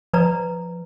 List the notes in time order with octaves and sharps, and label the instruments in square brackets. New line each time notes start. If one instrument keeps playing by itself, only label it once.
[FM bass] F3 [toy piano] B4 D5 A#5